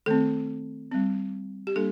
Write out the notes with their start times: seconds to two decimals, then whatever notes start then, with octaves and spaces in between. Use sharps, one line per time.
0.06 D#3 A3 C4 A4
0.91 G3 C4
1.67 G4
1.76 G3 A#3 D4 A4